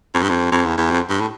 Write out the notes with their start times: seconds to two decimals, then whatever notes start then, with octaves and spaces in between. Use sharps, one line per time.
0.14 F2
0.22 G2
0.29 F2
0.52 F2
0.65 E2
0.78 E2
0.91 F2
1.10 G2
1.21 A2